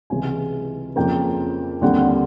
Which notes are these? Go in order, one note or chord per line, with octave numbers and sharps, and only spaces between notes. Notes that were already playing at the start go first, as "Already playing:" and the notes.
C#2 C3 E3 G#3 G#5
F2 C#3 F3 A#3 G5
D#2 D3 G3 C4 F#5